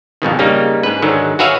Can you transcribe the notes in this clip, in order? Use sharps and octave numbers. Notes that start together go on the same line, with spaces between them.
F2 G#2 B2 D#3
C#3 G3 A#3 D#4
G#2 B4
G#2 D3 D#3 F#3
F#4 G#4 B4 C#5 E5 F5